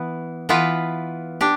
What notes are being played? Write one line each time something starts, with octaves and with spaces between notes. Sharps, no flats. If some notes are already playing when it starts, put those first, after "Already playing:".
Already playing: E3 B3
E3 B3 F4 B4
D4 G4